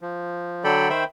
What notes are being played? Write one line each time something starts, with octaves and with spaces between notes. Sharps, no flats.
F3
D3 F#3 A4 D5 G5 B5
D#3 C5 E5 G5 B5